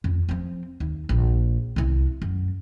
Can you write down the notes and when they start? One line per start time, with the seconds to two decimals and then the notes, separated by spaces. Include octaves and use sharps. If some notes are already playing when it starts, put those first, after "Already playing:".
0.04 F2
0.29 F3 C4
0.80 D#2
1.09 A#1
1.76 C2 C3
2.22 F#2